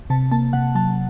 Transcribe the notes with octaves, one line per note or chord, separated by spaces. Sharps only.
C3 A5
A#3 A5
C3 F#5
F#3 A5